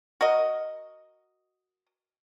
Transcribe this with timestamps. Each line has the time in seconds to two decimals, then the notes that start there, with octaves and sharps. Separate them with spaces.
0.21 F#4 A#4 D#5